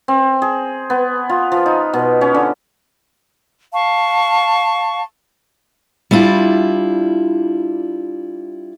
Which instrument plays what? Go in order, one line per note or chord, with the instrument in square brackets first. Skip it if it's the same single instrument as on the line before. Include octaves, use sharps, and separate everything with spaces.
[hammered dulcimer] C4
G#4
B3
F4
F3
D#4
B2
C#4
D3
[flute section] F5 A5 C#6
[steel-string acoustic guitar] G3 D4 E4 F4